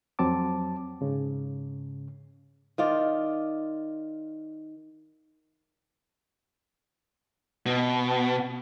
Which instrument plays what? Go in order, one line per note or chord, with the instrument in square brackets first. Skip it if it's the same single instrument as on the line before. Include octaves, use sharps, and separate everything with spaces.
[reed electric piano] F2 F#3 C4 A5 D6
G#2 C#3
[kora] D#3 F4 D5
[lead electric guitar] B2